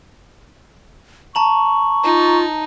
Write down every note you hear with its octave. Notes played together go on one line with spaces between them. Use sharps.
A5 A#5 C#6 F#7
D#4 F4